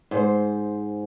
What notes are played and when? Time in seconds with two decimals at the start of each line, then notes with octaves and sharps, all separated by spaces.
0.11 G#2 C5